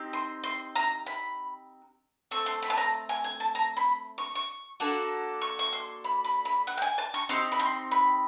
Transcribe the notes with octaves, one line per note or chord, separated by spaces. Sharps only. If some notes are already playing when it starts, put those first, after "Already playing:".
Already playing: C4 D#4 G4
C6
C6
A#5
B5
A3 C4 C#6
C6
B5
A5
A#5
G#5
G#5
A5
A#5
B5
C#6
C#6
A#3 D4 F#4 A4
C#6
C#6
C6
B5
B5
B5
F#5
G5
G#5
A5
C#6
C4 D#4 G4 C6
B5
C6
B5